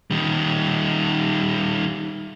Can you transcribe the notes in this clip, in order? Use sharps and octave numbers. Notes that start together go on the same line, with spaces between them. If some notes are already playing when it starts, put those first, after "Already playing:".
D#3 G3